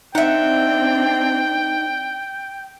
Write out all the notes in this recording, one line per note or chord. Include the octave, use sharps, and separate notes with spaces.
C4 D4 D#4 E5 F#5 G5